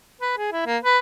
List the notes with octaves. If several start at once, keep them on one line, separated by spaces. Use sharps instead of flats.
B4
G#4
E4
A#3
B4